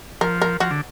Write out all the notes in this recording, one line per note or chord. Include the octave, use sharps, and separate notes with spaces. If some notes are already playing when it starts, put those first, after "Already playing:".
F3 A#4
A#4
F3 F#4
D3